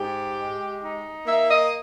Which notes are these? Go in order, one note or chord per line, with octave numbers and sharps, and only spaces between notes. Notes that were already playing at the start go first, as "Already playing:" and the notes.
Already playing: G#2 G4
G#3
D#4
A#3 E5
D#5